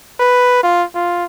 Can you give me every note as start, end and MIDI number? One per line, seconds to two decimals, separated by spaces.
0.20 0.61 71
0.63 0.83 65
0.95 1.25 65